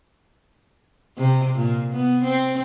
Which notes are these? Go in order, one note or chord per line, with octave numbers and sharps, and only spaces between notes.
C3
A#2
B3
C4